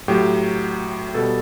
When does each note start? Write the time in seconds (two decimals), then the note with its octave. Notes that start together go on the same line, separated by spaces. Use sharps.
0.08 A2 F#3 G4
1.15 B2 G3 A4